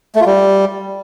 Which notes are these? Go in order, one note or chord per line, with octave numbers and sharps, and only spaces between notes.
A3
F4
G3